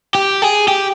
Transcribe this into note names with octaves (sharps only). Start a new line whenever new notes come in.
G4
G#4
G4